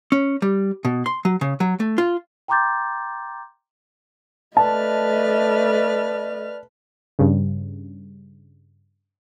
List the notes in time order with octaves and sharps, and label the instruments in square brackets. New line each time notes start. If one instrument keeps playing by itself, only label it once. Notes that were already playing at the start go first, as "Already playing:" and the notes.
[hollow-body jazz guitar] C#4
G3
B2
C6
F#3
C#3
F#3
A3
F4
[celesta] G5 A#5 C6 D6 G6 A6
[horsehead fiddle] A3 D#5 [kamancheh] B4 F6 [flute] D5 [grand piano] A5
[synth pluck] G2 C#3